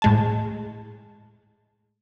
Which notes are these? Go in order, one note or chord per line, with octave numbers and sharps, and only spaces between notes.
A2 G#3 A5